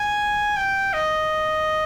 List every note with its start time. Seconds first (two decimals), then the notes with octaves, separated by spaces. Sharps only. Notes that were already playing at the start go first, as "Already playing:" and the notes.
Already playing: G#5
0.57 G5
0.93 D#5